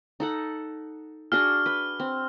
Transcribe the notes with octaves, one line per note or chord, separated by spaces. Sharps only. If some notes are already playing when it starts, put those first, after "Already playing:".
D#4 A4 F#5
D4 F#4 G#4 F6
B4
C4